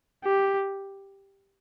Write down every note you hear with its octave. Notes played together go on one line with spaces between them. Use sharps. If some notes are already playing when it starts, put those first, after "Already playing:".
G4